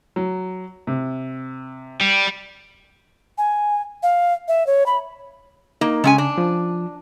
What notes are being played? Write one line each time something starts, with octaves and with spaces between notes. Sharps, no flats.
F#3
C3
G3
G#5
F5
E5
C#5
B5
A#3 D#4
C#3 G#3 C#4 G#5
D4
F3